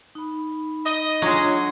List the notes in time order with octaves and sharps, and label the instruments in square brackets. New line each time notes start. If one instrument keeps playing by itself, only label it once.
[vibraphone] D#4 B5
[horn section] D#5
[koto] F#3 G#3 [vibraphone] D4 F4 C#5